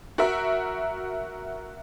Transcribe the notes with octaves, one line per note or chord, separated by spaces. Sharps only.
F#4 A#4 E5